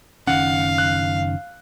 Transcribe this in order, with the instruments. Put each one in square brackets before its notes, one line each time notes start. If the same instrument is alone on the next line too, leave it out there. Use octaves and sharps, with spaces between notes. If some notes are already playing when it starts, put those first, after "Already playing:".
[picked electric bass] F#1 D#3 C#4 [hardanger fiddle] F5 [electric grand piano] F#5
[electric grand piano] F#6